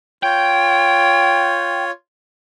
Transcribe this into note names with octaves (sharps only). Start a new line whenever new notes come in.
F4 C#5 G5